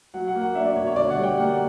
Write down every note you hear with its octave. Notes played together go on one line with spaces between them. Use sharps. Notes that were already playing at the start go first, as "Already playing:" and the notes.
F#3 F#5
F#5
A#3
F#5
D4 E5
D5
B2 C#5
C#5
D3 D5
F#5
G3
G5
A#3 F#5